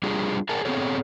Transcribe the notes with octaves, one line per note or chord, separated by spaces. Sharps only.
G3 D4 F4 G4 G#4
G#4 A#4 D5 F#5 G#5 A5
B3 C4 G#4 A4 C#5